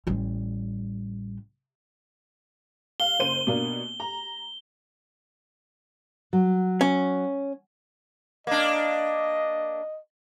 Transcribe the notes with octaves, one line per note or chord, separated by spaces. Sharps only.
A1 G3
F5 G7
F#1 C5 D#7
B2 A#3 D4
A#5
F#3
C#4
A#3 D4 D#5